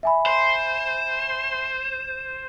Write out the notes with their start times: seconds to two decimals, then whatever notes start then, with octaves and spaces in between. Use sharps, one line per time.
0.03 E5 G#5 B5
0.26 C5